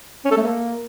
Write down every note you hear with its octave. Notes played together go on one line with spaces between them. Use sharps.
C#4
A4
A3
A#3